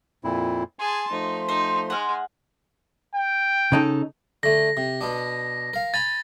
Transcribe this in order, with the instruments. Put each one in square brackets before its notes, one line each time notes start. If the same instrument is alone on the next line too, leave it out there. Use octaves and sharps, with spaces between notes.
[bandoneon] F2 A#2 E4
[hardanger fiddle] G#4 A5 [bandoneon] G#5 [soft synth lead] C6
[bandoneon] F3 A3 [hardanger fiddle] D#4
[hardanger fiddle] D#4 [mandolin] C5
[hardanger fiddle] G#3 [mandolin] F#5 F6
[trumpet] G5
[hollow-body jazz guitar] C#3 D#4 A4
[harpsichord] D3 A3 [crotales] A#6
[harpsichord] C3
B2 B3 D4
A#4 F5
[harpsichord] G#5 A#5 B5 [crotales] A6